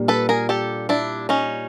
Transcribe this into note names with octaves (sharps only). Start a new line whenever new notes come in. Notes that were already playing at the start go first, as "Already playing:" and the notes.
Already playing: A#2 G3 A#3 D4
A4 B4
G#4 A#4
G4 A4
D4 E4
C#4 D#4